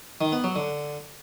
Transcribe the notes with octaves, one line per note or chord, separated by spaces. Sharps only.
D#3
B3
F#3
D3